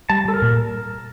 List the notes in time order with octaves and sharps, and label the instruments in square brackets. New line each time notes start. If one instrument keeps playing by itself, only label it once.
[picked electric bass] G3 [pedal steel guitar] A5
[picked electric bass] G3 [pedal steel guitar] A4
[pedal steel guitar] A#4
[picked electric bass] A#2